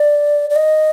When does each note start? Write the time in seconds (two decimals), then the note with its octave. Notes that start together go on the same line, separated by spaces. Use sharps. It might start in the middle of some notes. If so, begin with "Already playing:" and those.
Already playing: D5
0.50 D5
0.56 D#5